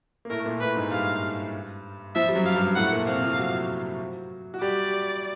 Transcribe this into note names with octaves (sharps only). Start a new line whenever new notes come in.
A#3
A2 A3 A#4
A3
A#2 A#3
A2 A3 B4
G#2 G#3
G2 G3 F5
F3 E5
G3
F#2 F#3
F5
G2 G3
A2 A3 F#5
A#2 A#3
C3 C4 F5
F3 F4
F#3 F#4
F#4
G3 G4 D5